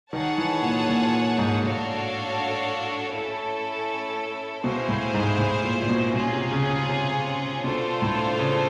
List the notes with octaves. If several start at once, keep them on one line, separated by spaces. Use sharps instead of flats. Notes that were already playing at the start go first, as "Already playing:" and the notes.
D#3 G#4 C#5 F#5 A5
E3
A#2
A#2
G#2
A2 D4 F#4 A4 C#5 F5
A3 C#4 E4 A4
B2 E4 G#4 C5 F5
A2
G#2
A2
A#2
A#2
B2
B2 C#4 F4 G#4
C3
C#3
C#3
C3
B2 D4 F4 A4 C5
A2
C#3